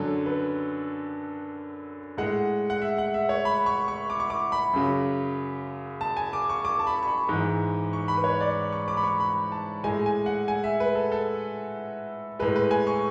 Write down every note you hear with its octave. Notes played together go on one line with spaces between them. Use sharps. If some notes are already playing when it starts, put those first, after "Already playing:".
Already playing: F#2 D3 F#3 A4
B4
A2 G#3 F#5
F#5
E5
F#5
E5
C#5
B5
C#6
C#6
D6
C#6
D6
B5
F#2 C#3 F#3
A5
G#5
D6
C#6
D6
A5
B5
C#6
B5
G#2 E3 G#3
C#6
B5
B4
C#5
D5
C#6
D6
B5
C#6
B5
A5
A2 G#3 G#5
G#5
F#5
G#5
E5
B4
A4
A4
A2 G#3 B4
B4
G#5
C#6